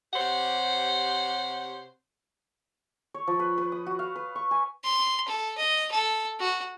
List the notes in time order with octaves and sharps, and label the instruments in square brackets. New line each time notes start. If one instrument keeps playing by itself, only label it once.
[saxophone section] C3 G4 C5 C#5 F#5
[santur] C#5
F3
B4
B4
D#6
F#4
F5
B4
C#6
G#5
[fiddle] C6
A4
D#5
A4
F#4